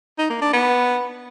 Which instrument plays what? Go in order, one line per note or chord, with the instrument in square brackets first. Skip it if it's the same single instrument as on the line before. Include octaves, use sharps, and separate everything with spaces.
[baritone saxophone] D#4
A#3
D4
B3